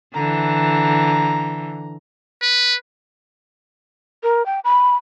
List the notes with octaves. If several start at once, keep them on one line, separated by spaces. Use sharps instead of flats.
D3 E3 A#5
B4
A#4
G5
B5